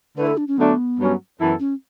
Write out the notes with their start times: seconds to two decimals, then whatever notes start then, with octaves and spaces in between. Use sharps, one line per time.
0.16 D3 A3 E4 B4
0.27 A4
0.37 D4
0.48 C#4
0.57 D3 F#3 A3 B3 D4
0.99 G2 F#3 C#4
1.40 F#2 E3 B3 E4 A4
1.60 C#4